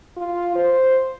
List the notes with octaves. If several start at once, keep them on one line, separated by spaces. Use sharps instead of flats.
F4
C5